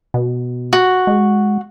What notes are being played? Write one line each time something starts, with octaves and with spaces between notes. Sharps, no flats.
B2
F#4
G#3